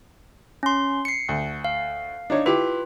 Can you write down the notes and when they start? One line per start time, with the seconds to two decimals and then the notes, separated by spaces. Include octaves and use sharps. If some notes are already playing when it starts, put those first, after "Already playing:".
0.63 C#4 C6
1.05 C7 C#7
1.29 D2
1.64 F5
2.30 D4 D#4 C#5
2.46 E4 F4 G4 B4